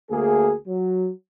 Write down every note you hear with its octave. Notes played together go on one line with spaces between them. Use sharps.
D2 A#3 G#4
F#3